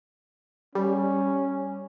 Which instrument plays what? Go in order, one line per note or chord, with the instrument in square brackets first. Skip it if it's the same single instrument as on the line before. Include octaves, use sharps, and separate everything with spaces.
[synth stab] G3 [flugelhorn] C#4